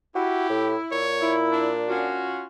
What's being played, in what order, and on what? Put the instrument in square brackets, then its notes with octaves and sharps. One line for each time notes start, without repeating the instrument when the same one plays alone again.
[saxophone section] E4 [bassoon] F#4 [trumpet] G4
[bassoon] A2
[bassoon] A#2 [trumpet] C#5
[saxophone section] E4
[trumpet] D4
[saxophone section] C#4 F4 F#4